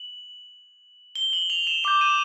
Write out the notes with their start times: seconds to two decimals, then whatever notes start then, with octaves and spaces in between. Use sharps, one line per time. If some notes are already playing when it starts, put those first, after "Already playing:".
Already playing: F#7
1.15 G7
1.33 F#7
1.50 F7
1.67 E7
1.84 D6 G6 E7
2.01 D#7